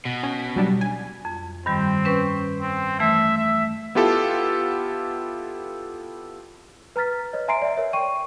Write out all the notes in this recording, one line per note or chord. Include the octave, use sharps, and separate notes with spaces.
B2
C#4
F#3 G3 D4
G#5
F2
G2 D#3 G3 C4
C#4 B4 C#6
C4
E3 A3 E5
E5
B3 E4 F4 G4 A4
B4 A#5 F6 A6 B6
B4 C#5 D#5
E5 G#5 A#5 C6 C7 D7
D5 E5
A#4 C#5 E5
G5 C#6 D#7